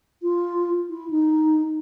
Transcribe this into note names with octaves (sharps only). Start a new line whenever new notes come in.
F4
E4
D#4